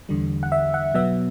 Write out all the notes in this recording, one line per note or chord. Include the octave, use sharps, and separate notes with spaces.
E2 D3 G3
F#5
E5
F#5
B2 F#3 B3 E5